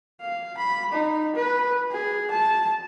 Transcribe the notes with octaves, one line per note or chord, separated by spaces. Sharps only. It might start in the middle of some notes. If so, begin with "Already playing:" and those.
F5
B5
D#4
B4
G#4
A5